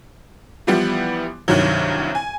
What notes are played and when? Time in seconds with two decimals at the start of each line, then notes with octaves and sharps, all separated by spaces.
0.67 E3 F3 G3 B3 E4
1.48 C2 G2 D#3 F#3
2.15 G#5